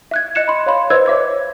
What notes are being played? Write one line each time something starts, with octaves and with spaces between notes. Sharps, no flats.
E5 F#6 G#6
D#5 F#6 C#7 E7
B5 C6
C#5 F5 B5 C6
B4 C5 D#5 E6 F#6 G#6
C#5 E5 D6 G#6